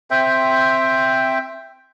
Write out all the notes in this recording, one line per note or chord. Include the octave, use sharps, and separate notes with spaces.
C4 C5 E5 G5